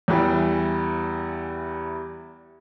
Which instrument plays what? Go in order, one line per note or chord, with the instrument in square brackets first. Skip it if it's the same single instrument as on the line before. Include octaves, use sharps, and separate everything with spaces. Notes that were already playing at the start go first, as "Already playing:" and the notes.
[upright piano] E2 E3 G3